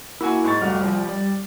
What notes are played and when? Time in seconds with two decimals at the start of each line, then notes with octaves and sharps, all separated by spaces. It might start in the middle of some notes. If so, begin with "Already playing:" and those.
0.21 A#3 E4 F#4 G#5
0.44 G#2 C#6 A6
0.61 F1 G3 F#4 F6
0.80 C2 F3 G3
1.09 D5